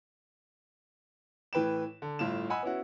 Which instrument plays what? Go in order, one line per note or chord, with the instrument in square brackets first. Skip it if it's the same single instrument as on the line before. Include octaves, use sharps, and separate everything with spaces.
[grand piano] A2 E3 B4 G5 E7
D3
G1 A2 F4 E7
D#5 F#5 G#5 B5 E6
B3 C#4 E4 F#4